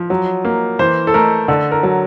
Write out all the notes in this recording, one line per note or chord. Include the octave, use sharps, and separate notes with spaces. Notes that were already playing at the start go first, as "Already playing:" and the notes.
Already playing: F3
F#3
A#3
E3 C5
A4
A3 A#4
D3 A4
A#4
F#3